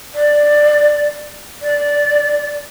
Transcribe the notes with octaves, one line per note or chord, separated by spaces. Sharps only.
D5
D5